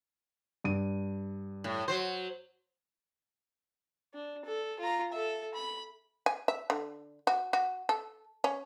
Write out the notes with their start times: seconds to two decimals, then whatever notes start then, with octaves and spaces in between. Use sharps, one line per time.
0.64 G2 D#7
1.64 A2
1.88 F#3 C5
4.14 D4
4.45 A4
4.80 F4 A#5
5.12 A4 E5
5.54 B5
6.26 G#5
6.48 E5
6.70 D3
7.27 F#4
7.53 F#4
7.89 A4
8.44 C#4